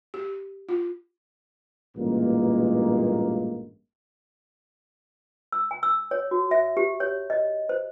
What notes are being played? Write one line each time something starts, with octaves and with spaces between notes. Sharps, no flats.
G4
F4
A1 G2 A#2 G#3 A#3
E6
G#5
E6
C#5
F#4
E5
G4
C#5
D#5
C5